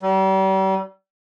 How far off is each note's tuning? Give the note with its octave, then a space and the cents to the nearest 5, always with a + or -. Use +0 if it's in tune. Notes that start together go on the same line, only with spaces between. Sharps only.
G3 -40